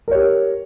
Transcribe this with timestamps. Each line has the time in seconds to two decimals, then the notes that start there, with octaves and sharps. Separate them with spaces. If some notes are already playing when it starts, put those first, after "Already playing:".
0.08 A#4
0.11 C#5
0.15 G4